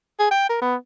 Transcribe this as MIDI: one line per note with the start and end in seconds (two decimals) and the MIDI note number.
0.19 0.28 68
0.31 0.48 79
0.50 0.61 70
0.62 0.76 59